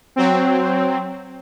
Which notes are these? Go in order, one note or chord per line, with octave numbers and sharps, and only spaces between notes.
F#3 C4